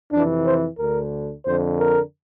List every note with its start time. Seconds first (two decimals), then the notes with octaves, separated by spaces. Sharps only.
0.12 F2 C3 E3 D4
0.46 C5
0.79 D2 D3 A#4
1.46 F2 D3 C5
1.80 A#4